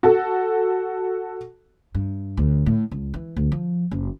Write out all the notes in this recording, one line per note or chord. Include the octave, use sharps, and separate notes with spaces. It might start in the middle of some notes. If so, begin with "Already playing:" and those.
F#4 A4
G2
D2
A2
C#2
E3
D2
F3
F#1